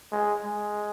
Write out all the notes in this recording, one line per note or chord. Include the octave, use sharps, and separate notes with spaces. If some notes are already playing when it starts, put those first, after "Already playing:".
G#3
G#3